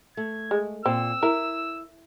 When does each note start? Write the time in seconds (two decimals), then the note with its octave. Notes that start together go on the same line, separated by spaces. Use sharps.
0.17 A3 G#6
0.51 G#3
0.86 A#2 C4 E6
1.23 E4 A#4